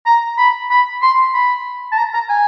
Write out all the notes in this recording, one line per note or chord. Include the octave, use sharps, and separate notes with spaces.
A#5
B5
B5
C6
B5
A5
A#5
A#5
G#5